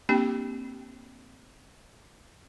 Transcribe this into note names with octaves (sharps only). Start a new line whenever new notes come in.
A#3 C4 D4 G4 G5